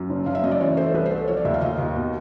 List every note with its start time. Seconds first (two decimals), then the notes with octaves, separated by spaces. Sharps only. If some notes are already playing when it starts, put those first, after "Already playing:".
Already playing: F#2
0.10 F#1
0.26 F#1 F5
0.35 E5
0.43 F#2 D#5
0.51 D5
0.60 E3 C#5
0.77 A3 C5
0.94 C2 B4
1.06 C5
1.11 A3
1.16 C5
1.28 F3 C#5
1.37 D5
1.45 D#2 E5
1.54 F5
1.61 D#2 D#5
1.79 D#2
1.96 B2